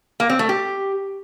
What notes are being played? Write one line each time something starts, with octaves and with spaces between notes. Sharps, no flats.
A#3
C4
A3
G4